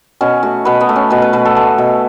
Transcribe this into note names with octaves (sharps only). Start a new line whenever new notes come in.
B2 C#4
A3 F#4
B2 B4
B3
A3
C#4
B2 B4
B4
B2 B4
A4
A3
B2